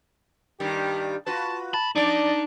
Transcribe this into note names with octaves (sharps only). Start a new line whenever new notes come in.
G2 D#3 G3 G4
F4 F#4 B4 A5
A5 B5
F2 D4 D#4 D5